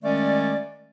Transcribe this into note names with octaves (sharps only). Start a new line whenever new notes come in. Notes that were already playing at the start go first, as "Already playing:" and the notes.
D#3 G#3 A3 C#4 D5